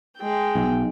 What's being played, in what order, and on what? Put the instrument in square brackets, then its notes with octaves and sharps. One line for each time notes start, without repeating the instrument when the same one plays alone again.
[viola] G#3 G5
[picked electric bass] B1